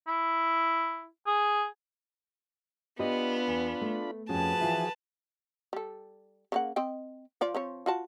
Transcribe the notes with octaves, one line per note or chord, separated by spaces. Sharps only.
E4
G#4
B3 D4 F4 G4 D#5 B5
E2
A3
F2 F3 C#4 F#4 G#4 B4 A5
E3 F4 E5
G3 A4
C#3 A#3 F#5
C4 D#5 G5
F3 F4 D5
F3 C4 C#5
F4 F#4 A5